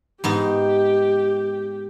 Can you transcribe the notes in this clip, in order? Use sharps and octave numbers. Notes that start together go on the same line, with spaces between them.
G#2 B3 D#4 G4